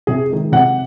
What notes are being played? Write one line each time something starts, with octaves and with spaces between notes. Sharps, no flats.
C3 G#4
D#3 G#3
C3 F#5